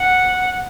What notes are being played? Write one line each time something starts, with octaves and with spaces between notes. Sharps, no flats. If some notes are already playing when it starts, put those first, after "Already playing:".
Already playing: F#5